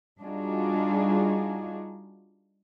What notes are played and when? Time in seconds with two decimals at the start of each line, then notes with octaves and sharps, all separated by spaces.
0.20 G3 D4 D#4 F4 F#4 G#4